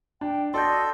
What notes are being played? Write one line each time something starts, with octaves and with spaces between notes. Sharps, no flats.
D4 G5
F#4 A4 D5 D#5 C6 G6